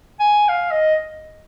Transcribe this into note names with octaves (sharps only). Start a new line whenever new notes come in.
G#5
F5
D#5